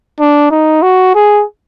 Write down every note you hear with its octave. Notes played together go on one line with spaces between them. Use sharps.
D4
D#4
F#4
G#4